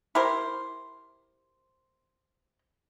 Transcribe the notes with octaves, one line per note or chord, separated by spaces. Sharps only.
E4 G4 A#4 C5